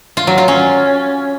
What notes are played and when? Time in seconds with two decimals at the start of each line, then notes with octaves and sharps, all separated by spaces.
0.17 F4
0.27 F#3
0.38 F4
0.48 C#4